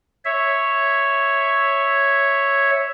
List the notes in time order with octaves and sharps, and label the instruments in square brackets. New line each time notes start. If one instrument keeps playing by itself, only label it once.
[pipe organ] C#5 E5